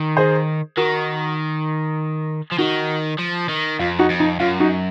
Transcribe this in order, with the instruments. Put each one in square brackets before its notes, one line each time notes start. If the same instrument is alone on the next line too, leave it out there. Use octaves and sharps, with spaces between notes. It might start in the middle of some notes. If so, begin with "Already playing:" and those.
Already playing: [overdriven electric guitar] D#3
[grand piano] G#4 C5
[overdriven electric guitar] D#3 [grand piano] F#4 A#4
[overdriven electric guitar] F3
[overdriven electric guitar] D#3 [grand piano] D#4 F#4
[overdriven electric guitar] F3
D#3
[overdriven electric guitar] F2 [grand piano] F4
[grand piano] D#4 F#4
[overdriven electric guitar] F2
[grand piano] D#4
[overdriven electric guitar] F#2 [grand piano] F4
[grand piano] D#4 F#4